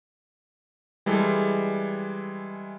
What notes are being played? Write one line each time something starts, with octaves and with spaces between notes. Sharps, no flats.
E3 G3 G#3 A4